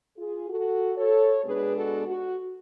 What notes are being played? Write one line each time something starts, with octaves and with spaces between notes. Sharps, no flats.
F4 G#4
F#4 A4
A4 C#5
B2 G#3 B3 D4 G#4 B4
F#4 A4
F#4